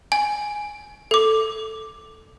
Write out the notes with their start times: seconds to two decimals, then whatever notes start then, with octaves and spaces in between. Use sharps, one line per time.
0.12 G#5
1.11 A4 D6